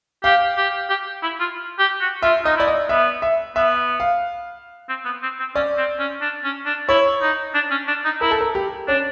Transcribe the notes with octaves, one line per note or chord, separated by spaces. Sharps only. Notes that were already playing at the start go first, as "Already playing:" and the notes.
G4 F5
G4
G4
E4
F4
G4
F#4
F4 E5
D#4 D#5
E4 D5
D#5
B3 E5
E5
B3 E5
F5
C4
B3
C4
C4
C#4 D5
C4
C#4
D4
C#4
D4
E4 C#5
D#4
D4
C#4
D4
D#4
E4 A#4
A4
A#4
G4
C#4 D4